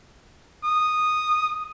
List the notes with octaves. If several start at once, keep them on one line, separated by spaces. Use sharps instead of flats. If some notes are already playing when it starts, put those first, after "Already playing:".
D#6